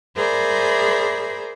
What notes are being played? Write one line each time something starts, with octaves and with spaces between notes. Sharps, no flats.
G#4 A#4 C5 D5 E5 B5